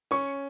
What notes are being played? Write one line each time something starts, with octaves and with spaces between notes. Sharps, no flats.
C#4 C#6